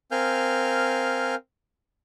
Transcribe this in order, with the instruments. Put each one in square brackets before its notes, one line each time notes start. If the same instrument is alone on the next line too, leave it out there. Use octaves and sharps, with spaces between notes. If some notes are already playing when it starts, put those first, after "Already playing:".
[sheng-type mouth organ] C4 A#4 F5 G#5 F6 G6